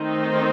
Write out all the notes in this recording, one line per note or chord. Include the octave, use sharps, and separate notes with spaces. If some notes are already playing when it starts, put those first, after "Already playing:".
Already playing: D#3 A3 C4 D#4